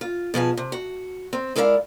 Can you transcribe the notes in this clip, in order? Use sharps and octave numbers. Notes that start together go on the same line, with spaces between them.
F4
B2 F3 G#4 A5
C3
F#4
C4
G#3 E4 A#4 D5 E5 F5